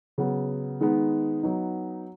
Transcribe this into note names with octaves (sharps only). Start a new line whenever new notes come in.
C#3 F#3 B3
D#3 G#3 B3 D#4
F#3 B3 D#4